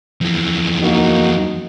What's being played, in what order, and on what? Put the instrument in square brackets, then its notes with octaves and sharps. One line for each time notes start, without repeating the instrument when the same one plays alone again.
[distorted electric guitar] F2 E3
[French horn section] A#3 D#4 F#4